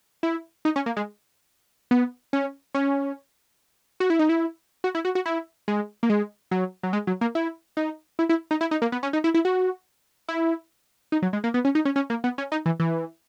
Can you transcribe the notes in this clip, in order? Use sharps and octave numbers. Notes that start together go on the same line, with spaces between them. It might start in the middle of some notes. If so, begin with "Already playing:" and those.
E4
D#4
C#4
A#3
G#3
B3
C#4
C#4
F#4
E4
D#4
E4
F#4
E4
F#4
F#4
E4
G#3
A#3
G#3
F#3
F#3
G#3
F#3
A#3
E4
D#4
E4
E4
D#4
E4
D#4
A#3
B3
C#4
D#4
E4
E4
F#4
E4
D#4
F#3
G#3
A#3
B3
C#4
D#4
C#4
C#4
A#3
B3
C#4
D#4
E3
E3